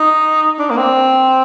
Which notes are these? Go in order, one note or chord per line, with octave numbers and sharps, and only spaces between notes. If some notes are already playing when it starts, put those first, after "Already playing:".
Already playing: D#4
D4
A#3
C4